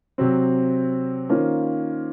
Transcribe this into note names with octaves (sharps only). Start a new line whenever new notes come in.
C3 F#3 C4
D#3 A#3 C#4 F4 C5